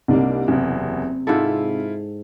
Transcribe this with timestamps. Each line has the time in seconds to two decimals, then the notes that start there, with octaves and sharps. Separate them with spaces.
0.08 C2 C3 A#3 D4 D#4
0.48 F#1 E2 C3
1.27 G#2 E4 F4 A4